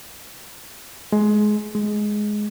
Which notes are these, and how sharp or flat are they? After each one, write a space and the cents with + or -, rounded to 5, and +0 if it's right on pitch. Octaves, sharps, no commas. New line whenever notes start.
G#3 +20
G#3 +10